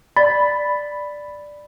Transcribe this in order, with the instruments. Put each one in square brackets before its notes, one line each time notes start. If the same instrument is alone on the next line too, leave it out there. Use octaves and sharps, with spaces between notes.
[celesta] D5 A6 [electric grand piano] B5